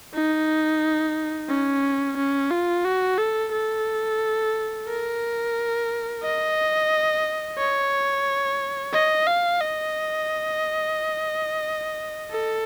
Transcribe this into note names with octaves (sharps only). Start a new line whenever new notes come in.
D#4
C#4
C#4
F4
F#4
A4
A4
A#4
D#5
C#5
D#5
F5
D#5
A4